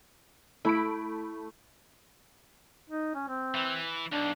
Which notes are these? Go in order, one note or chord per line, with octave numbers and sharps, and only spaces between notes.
A3 E4 B5 D7
D#4
C#4
C4
E3
B1 D4